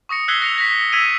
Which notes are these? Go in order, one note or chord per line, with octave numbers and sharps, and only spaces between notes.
C#6 D#6 A#6 C#7
E6 F#6 G#6 B6 C7 G7
A#6 C#7 F7
A#6 B6
E6 G#6 B6 D7 D#7 F7